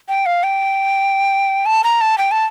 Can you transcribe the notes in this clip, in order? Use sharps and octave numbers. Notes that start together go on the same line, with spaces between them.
G5
F5
G5
A5
A#5
A5
G5
A5